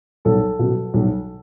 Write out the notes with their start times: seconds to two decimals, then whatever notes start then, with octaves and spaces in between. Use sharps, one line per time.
0.25 B1 A4
0.59 B2 F#3
0.94 B1